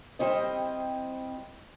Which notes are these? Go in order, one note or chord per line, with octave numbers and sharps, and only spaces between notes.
G3 C4 E4 C5 D#5